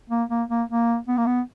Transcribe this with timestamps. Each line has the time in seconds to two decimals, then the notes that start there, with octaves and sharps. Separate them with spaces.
0.10 A#3
0.30 A#3
0.49 A#3
0.69 A#3
1.08 B3
1.17 A#3
1.26 B3